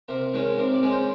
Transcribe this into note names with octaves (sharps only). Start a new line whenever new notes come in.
C3 A#4
D#3 G#3 C#4
C3 A#4
D5
D#3 G#3 C#4
C5